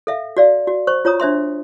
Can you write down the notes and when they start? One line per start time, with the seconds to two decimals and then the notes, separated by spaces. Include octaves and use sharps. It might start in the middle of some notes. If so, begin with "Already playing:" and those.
0.07 A4 E5 F5
0.37 F#4 D5 F5
0.67 F#4
0.87 C5 C#6
1.05 F4 C#5 A#5 D#6
1.20 D4 C5 E5 C6